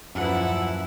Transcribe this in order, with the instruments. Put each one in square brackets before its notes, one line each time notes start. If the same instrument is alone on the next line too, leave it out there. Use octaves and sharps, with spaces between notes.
[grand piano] D#1 F3 B4 [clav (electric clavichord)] F#2 [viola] E4 F#5